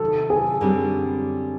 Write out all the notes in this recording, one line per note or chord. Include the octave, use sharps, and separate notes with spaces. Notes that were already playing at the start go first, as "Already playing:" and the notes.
Already playing: C3 D#3 F#3 A4
G#4
F#2 D3 G3 C4